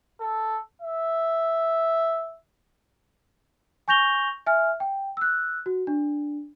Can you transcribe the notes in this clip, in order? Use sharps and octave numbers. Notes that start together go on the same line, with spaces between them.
A4
E5
G#5 C#6 G6 A#6 F7 G7
E5 G#5 F6
G5
E6 F#6
F#4
D4